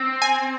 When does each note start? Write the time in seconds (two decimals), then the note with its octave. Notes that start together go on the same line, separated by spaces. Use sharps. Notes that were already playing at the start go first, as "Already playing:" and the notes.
Already playing: C4
0.22 G#5